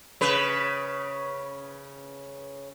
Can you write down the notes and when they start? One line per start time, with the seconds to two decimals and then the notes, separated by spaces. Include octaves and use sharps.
0.21 C#3 B4